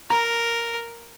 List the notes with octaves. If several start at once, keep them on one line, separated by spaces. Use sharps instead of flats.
A#4 A#5